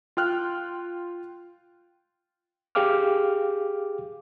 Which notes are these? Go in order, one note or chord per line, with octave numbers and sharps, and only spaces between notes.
F4 G5 F6 F#6
G4 G#4 F5 G5 D6 F6